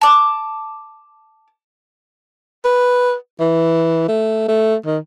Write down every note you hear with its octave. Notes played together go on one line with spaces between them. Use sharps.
A5 D6
B4
E3
A3
A3
D#3